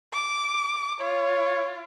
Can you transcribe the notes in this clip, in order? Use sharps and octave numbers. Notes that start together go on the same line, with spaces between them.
D6
F4 C#5